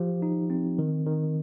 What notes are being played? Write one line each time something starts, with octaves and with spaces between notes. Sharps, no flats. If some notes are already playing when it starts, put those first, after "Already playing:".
Already playing: F3 G4
D#4
C4
D#3
D#3